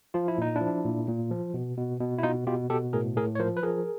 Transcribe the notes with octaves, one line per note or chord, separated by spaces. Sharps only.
F3 F4
E4
A#2 D#4
D4 E4
F3
A#2
A#2
F3
B2
B2
B2
E4
B2 D#4 F4
B2 F4 G4
B2 G4 A4
A2 G#4 A#4
A2 G#4 A#4
C#5
F3 A#4 C5
B4
F3 G#4 A#4